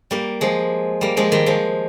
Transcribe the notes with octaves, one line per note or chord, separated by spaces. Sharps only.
G3 A#3
F3 G#3
G3 A#3
F3 G#3
D#3 G3
F3 G#3